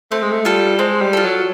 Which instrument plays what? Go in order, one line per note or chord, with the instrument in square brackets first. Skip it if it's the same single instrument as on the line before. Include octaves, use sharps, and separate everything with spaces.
[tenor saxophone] A3 [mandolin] C4
[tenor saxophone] G#3
A3
[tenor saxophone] G3 [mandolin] F4 A4
[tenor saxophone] G#3 [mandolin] C4
[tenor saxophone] G3
[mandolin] F4 A4
[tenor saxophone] F#3